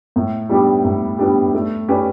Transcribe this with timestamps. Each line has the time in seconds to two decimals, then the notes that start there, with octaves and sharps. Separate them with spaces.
0.16 A2
0.49 G3 B3 D4 G4
0.84 A2
1.18 G3 B3 D4 G4
1.54 A3
1.88 C#4 G4 B4 D5